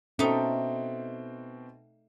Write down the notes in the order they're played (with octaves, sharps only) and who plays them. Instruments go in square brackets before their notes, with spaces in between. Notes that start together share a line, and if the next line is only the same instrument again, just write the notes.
[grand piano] B2 C4 G5 [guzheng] A3 D#4 [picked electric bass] C#4